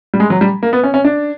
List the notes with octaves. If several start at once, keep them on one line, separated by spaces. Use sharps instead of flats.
G3
G#3
F#3
G3
A#3
B3
C#4
C#4
D4